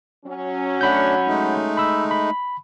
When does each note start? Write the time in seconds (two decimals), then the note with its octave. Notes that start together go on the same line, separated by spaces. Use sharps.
0.25 F#3 C#4
0.81 A3 D4 F#5 B5 G6
1.27 G#3 A3 D#4
1.77 B5 E6
2.11 B5